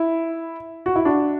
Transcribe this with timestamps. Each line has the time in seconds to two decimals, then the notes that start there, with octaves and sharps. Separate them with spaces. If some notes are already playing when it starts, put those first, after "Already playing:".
Already playing: E4
0.86 F#4
0.96 E4
1.05 D4 F#4